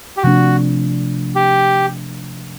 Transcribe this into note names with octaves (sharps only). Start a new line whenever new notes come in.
G4
C3 F3 A3 D4 F#4
G4